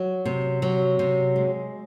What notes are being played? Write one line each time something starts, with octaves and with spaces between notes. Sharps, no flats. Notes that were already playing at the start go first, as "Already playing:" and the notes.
Already playing: F#3
C3
F#3
C3
G#3